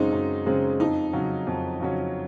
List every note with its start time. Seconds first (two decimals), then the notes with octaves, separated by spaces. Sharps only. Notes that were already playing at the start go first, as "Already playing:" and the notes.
Already playing: F#2 C#3 G#3 C4 D#4
0.12 F#2
0.46 C#3 G#3 C4
0.80 F2 D#4
1.13 C#3 F#3 C#4
1.47 F2
1.80 C#3 F#3 C#4